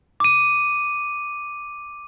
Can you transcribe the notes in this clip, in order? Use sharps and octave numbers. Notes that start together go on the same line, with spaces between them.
D6 D#7